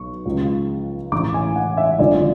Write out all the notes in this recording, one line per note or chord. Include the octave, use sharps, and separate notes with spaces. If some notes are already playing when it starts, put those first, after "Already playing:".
Already playing: B1 B2 C#6
C#2 C#3 F3
A1 A2 E3 D6
G#5
F#5
E5
G#1 F#2 D3 F3 D5